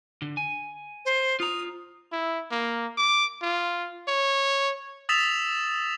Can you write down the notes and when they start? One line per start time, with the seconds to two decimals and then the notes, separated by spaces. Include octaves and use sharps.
0.22 D3
0.37 G#5
1.05 C5
1.40 F4 A#5 D#6
2.12 E4
2.52 A#3
2.97 D6
3.42 F4
4.08 C#5
5.09 D#6 E6 A6 B6 E7 F7